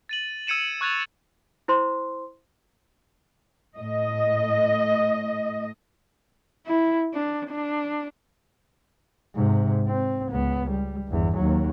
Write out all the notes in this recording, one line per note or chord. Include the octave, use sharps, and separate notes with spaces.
A6 D#7 F#7
E6 G#6 C#7 D#7 E7
C#6 F#6 G#6 A6 F7
E4 C5 C6
A2 D#5
E4
D4
D4
G#2 C3
C4
C#2 B3
G3
G1 E2
D#2 F#3